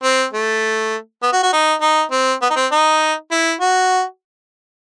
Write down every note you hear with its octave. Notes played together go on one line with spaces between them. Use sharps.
C4
A3
B3
F#4
F#4
D#4
D#4
C4
B3
D#4
C4
D#4
E4
F#4